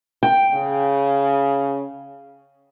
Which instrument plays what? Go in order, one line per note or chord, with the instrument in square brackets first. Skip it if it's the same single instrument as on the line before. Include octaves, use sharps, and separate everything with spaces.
[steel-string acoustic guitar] G5
[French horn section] C#3